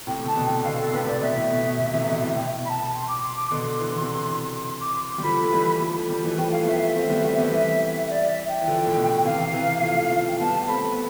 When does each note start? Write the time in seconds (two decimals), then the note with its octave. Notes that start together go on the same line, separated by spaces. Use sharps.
0.07 A2 C3 G5
0.25 C3 A5
0.36 B2 D3
0.46 G5
0.64 B2 D3 F5
0.79 A4
0.93 A2 C3 B4
1.07 D5
1.21 B2 E5
1.36 A2
1.50 B2
1.65 B2
1.80 A2 C3
1.93 C3 E3
2.07 B2 D3
2.22 A2 C3
2.36 B2 G5
2.65 B5
2.69 A5
2.94 C6
3.08 D6
3.23 C6
3.36 D6
3.51 B2 D3 C6
3.80 E3
3.91 D3
4.01 C3 E3
4.66 C6
4.81 D6
4.95 C6
5.09 C6
5.18 G3
5.23 D3 F3 B5
5.43 A3
5.52 E3 G3
5.81 F3 A3
6.09 G3
6.17 F3
6.24 E3 G3
6.38 F3 A3 G5
6.52 F5
6.62 B3
6.67 F3 A3 E5
6.82 E5
6.96 A3 C4
7.09 G3 B3
7.25 A3 C4
7.38 G3 B3
7.52 E3 G3 E5
7.81 E5
8.10 D5
8.30 E5
8.48 G5
8.61 E3
8.67 D3 F3
8.87 A2
8.96 B2
9.24 C3 E3 F5
9.53 C3 E3
9.82 F3 A3
10.11 F3 A3 F5
10.28 G5
10.40 G3 B3 A5
10.68 A3 C4 B5
10.92 B3